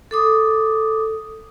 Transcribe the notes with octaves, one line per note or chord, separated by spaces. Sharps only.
A4 D6 D#6